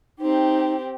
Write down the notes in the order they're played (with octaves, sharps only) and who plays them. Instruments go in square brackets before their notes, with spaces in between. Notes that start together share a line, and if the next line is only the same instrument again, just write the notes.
[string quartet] C4 G4 [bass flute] D#4